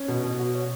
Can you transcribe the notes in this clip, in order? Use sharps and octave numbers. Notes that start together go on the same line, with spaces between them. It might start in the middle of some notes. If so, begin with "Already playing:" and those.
Already playing: C#4
B2
B2
F#4
C#5